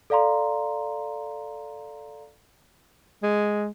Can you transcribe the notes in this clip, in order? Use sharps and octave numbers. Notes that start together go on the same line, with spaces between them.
A4 D5 F5 A#5 C6
G#3